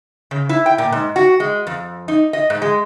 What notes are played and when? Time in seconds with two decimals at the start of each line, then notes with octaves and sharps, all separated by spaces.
0.31 C#3
0.49 E4
0.66 G5
0.78 A#2
0.92 G#2
1.16 F#4
1.40 G#3
1.67 F2
2.08 D#4
2.33 D#5
2.50 G#2
2.62 G#3